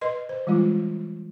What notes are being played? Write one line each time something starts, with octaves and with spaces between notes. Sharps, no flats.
B4 D#5 C6
C5
E3 G3 G#3 F4